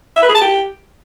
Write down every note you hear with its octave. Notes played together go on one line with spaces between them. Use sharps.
E5
B4
G#4
A5
G4